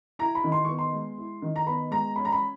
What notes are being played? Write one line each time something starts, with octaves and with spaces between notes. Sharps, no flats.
E4 A#5
B5
D#3
C6
B3 C#6
C6
G#3
E4
D#3
A#5
B3 B5
G#3 A#5
C#4 B5
A#5
B5